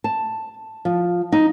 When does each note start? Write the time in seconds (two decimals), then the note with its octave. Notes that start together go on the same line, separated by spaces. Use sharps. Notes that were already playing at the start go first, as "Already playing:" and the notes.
0.04 A5
0.85 F3
1.32 D#4